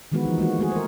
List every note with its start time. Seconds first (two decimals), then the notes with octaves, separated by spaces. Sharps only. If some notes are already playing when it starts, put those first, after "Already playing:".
0.12 D#3 E3 G#3 B3 F#4 B4
0.25 E3 F3 D#4
0.38 E3 G#3 A#3 F#4
0.58 G#3 A3 F#4 G#4
0.72 A#4 C5